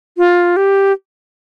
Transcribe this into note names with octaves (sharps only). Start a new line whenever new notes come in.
F4
G4